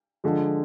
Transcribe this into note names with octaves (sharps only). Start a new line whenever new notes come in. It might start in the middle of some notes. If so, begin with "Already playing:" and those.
D3 F3 G#3